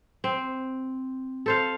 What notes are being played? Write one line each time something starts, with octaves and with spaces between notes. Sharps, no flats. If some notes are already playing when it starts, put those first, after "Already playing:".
C4
A4 C5 F5